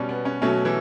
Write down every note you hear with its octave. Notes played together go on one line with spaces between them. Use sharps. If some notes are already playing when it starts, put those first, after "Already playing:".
Already playing: B2 G3 C#4
B3
C#4
B2 F#3 A3 C#4
E3 E4